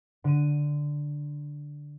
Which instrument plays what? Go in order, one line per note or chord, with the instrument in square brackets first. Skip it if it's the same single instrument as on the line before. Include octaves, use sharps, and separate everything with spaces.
[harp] D3 D#7